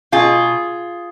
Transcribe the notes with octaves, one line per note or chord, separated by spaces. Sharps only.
B2 F4 G#4